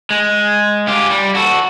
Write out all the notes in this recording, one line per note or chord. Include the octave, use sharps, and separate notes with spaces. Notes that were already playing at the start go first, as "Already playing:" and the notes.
G#3
F4 G4
G3
F#4 A4